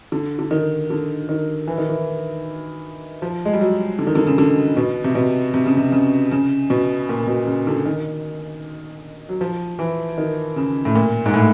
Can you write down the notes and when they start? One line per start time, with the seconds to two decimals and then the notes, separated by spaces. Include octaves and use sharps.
0.12 D3
0.39 D3
0.51 D#3
0.90 D3
1.29 D#3
1.67 E3
1.78 D#3
1.89 E3
3.22 F3
3.45 G#3
3.53 G3
3.61 F#3
3.99 D3
4.07 D#3
4.15 D3
4.27 C#3
4.38 D3
4.77 B2
5.04 C3
5.15 B2
5.54 C3
5.66 C#3
5.77 C3
5.92 C#3
6.31 C#3
6.70 B2
7.09 A#2
7.28 B2
7.47 C#3
7.67 D3
7.85 D#3
9.29 F#3
9.41 F3
9.79 E3
10.18 D#3
10.56 C#3
10.85 A2
10.95 A#2
11.26 G#2
11.34 A2